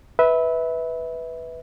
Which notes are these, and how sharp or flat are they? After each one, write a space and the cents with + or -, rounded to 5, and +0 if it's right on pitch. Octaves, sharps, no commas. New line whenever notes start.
B4 +0 E5 -25